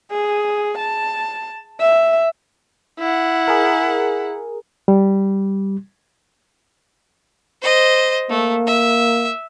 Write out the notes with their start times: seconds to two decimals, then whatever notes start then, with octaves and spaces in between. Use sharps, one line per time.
0.11 G#4
0.77 A5
1.80 E5
2.99 E4 F#5
3.48 G#4 A#4
4.88 G3
7.61 C5 D#5
8.30 A3 A#3
8.66 E5